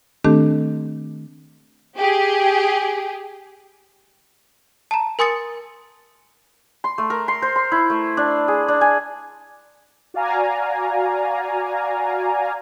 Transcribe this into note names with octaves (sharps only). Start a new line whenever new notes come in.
D#3 A3 C4 D4 G4 A4
G4 G#4
A5 A#5
A#4 G#5 C6 D#6 A6 C#7
C6
A3
A#4
C6
C5
C6
E4
A3
D4
G#4
D4
G#5
F#4 D5 F5 G#5 A#5